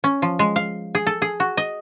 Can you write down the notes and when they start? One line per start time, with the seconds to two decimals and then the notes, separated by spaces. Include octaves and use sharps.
0.04 C#4
0.22 F3
0.39 G#3
0.56 F5
0.95 G#4
1.07 A4
1.22 G#4
1.40 F#4
1.57 D#5